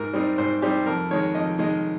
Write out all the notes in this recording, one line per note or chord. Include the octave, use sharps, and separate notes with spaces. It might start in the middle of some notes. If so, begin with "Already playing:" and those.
Already playing: G#2 A#4
G3 C4 D#4
G#2 C5
G3 C4 D#4 G4
F2 A#4
D#3 G#3 C#5
F2 D#5
D#3 G#3 D#5